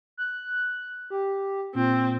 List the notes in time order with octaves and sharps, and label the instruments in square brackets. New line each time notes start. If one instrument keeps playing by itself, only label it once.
[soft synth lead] F#6
G4
[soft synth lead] A#2 [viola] C4